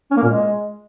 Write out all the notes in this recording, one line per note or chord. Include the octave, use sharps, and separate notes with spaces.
C#4
A#3
A#2
G#3